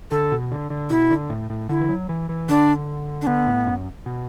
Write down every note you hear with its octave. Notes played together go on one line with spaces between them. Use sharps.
D3 A4
B2
D3
D3
B2 E4
D3
A2
A2
D3 E4
E3
F#3
E3
E3
D3 D4
D4
D3 B3
A2
F#2
B2